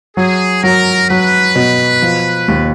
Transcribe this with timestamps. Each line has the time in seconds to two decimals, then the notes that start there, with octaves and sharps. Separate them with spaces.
0.17 F#3 G#4
0.63 F#3 A#4
1.10 F#3 B4
1.56 B2
2.02 F3
2.48 D#2